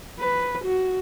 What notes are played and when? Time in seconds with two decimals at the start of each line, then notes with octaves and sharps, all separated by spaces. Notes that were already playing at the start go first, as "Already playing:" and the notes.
0.19 B4
0.64 F#4